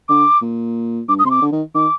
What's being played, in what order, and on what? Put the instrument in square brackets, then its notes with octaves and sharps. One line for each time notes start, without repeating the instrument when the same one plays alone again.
[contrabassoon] D3 [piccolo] D6
[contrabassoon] A#2
[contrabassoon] G2 [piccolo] D6
[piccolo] D#6
[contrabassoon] C3 [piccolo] C6
[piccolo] D6
[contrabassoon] D3
D#3
[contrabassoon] D#3 [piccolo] D6